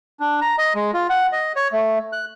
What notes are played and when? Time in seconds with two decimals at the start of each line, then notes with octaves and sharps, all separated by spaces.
0.20 D4
0.41 A#5
0.58 D#5
0.75 G#3
0.94 F4
1.09 F#5
1.32 D#5
1.56 C#5
1.72 A3
2.13 F#6